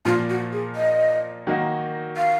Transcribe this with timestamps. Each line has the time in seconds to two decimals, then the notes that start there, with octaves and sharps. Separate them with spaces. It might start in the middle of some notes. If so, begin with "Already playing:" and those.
0.05 A#2 F3 A#3 F4
0.30 F#4
0.52 G#4
0.76 D#5
1.47 D#3 F#3 A#3 D#4 F#4
2.17 F5